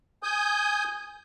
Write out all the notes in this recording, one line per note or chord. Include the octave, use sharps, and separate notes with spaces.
G#5 D#6 G6